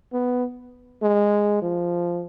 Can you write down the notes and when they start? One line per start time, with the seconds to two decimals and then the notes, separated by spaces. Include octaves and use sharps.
0.13 B3
1.02 G#3
1.62 F3